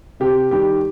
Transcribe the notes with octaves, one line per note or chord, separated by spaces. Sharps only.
C3 G4
D#3 G3 G4